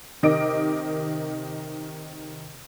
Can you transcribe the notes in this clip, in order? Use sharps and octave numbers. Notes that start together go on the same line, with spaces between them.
C3 D#3 A#4 D#5 D6 D7